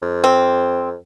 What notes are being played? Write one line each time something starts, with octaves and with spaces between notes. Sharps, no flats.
F2
C4